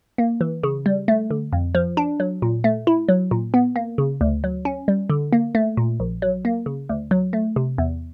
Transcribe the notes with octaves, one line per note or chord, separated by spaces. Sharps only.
A#3
E3
C#3
G3
A3
D3
F2
F3
D4
F#3
A#2
A3
E4
F#3
A#2
B3
A#3
C#3
D2
F#3
C#4
G3
D3
A#3
A3
A#2
A#1
F#3
A#3
C#3
D2
F#3
A3
C3
E2